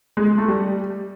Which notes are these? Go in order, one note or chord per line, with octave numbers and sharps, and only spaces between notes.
G#3
G#3
A3
G3